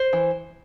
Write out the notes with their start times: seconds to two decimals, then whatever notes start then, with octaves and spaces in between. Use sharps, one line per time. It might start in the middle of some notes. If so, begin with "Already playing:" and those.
Already playing: C5
0.13 E3